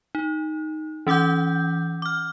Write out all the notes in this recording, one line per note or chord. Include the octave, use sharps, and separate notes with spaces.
D#4
E3 C#4 F#5 D6 G6
D6 F6